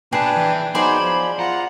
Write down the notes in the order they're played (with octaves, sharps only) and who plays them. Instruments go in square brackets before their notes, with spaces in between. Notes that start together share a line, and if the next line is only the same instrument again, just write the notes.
[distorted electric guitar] B2 A5 [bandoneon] D4 B4 G5 [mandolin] G#4
[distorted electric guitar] E3
[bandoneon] F#3 B3 D#4 [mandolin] G#4 C5 D5 [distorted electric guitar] B5
[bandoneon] F3
[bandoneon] F4 A#5 [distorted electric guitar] F#5